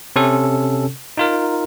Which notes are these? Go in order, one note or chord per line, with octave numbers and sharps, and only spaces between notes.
C3 C#4 A4
D#4 F4 A#4